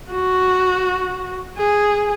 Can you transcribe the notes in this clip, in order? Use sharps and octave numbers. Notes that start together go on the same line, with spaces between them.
F#4
G#4